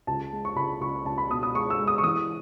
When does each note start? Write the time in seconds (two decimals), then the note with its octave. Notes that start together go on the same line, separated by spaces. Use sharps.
0.07 C#2 A5
0.33 G#3
0.45 C#6
0.56 C#2 B5
0.81 C#2 C#6
1.06 C#2 A5
1.18 B5
1.30 B2 D#6
1.43 D#6
1.55 G#3 C#6
1.70 E6
1.79 G#3
1.87 D#6
1.98 C#6
2.03 E3 D#6